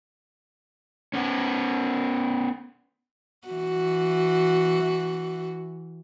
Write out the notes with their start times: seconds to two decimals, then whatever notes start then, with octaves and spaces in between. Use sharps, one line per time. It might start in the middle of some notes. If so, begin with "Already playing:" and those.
1.14 B3 C#4
3.48 E3 F#4